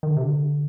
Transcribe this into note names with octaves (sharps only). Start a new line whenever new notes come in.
D#3
D3
C3
D3